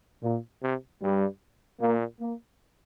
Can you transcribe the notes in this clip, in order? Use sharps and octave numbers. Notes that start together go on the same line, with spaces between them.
A#2
C3
G2 G3
A#2 A#3
A#3